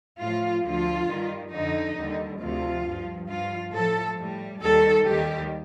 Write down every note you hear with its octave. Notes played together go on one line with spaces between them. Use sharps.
A2 F3 F4
D2 D3 F3 F4
G2 D#3 G3
F2 D3 F3 D#4
D#2 D3 G3
D2 C3 F3 F4
G2 F3
G2 F3 F4
A2 F3 A4
A2 G3
D#2 D#3 G3 A4
D#2 D#3 G3 G4